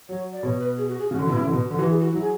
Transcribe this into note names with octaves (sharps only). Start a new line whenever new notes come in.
F#3 C#5
D5
B2 C#5
B4
G#4
F#4
G#4
C#3 F#4
D3
B2 E4
C#3
D3
B2
D3
E3 F#4
G#4
F#4
F#3 E4
G#4